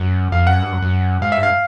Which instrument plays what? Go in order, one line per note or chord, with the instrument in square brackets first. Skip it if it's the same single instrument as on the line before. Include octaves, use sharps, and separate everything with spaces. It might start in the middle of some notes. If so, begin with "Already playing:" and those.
Already playing: [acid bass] F#2 [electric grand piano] F#5
[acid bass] F2 [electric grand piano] F5
[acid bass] F#2 [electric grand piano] F#5
[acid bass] G2
F#2
F#2
[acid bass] G#2 [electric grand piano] F5
[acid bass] G2 [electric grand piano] E5
[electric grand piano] F5